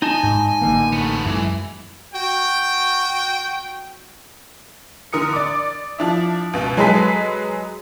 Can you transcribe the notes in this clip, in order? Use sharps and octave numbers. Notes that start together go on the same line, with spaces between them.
D#4 D#5 G#5 A5
G#2
A1 D3 A#3
A3 B3
F#2 E3 G#3
F#4 G5
D3 A#4 D#6 C#7
D5 D6
F3 D4 E4
C#2 B2
F#3 G#3 G#4 A4 B4 B6